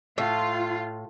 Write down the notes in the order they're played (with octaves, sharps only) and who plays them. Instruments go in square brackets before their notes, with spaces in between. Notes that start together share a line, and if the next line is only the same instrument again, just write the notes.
[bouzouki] A2 [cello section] F4